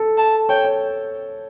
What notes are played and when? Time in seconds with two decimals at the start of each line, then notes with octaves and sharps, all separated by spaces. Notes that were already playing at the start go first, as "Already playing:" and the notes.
Already playing: A4
0.18 A5
0.49 C#5 G5
0.65 C#5